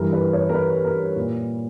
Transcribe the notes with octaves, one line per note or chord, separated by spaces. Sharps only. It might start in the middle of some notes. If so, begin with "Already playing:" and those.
Already playing: G2 E3 A#4
B4
C#5
A#4
B4
A#4
A#2